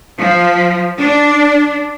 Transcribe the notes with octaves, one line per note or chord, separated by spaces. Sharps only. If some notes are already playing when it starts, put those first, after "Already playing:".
F3
D4